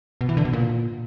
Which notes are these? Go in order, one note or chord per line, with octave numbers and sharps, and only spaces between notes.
B2
E3
D3
B2
A#2